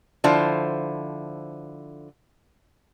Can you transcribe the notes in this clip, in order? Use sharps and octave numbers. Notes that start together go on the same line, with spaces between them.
D3 F3 E4 C5